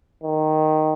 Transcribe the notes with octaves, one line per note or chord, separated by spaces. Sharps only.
D#3